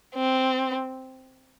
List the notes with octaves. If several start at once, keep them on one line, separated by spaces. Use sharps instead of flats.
C4